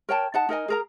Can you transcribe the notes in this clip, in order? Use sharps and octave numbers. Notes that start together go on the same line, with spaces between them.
A#4 C#5 G5 A5
D#4 F#5 A5
D#4 A#4 D#5 G#5
G#4 A#4 A#5